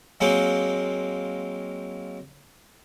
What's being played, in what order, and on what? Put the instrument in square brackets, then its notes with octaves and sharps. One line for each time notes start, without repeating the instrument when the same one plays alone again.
[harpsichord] F#3 G#3 A#3 C4